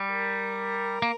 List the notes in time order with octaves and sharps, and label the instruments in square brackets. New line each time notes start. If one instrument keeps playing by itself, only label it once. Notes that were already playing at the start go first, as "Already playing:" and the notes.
Already playing: [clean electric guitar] G3
[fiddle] A#4
[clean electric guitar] A#3